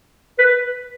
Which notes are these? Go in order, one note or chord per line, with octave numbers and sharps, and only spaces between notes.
B4